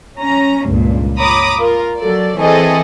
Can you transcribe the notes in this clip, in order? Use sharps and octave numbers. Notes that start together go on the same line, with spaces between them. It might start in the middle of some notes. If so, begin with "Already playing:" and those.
C#4 A#5
C#2 G2 A#2
C#5 A#5 B5 D6 D#6
F4 A#4
F#3 A4 D5
E3 C4 G#4 A4 D#5